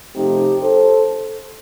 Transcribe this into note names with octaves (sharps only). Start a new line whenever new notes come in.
C3 F3 A3 C4 D#4 G4
A4 C5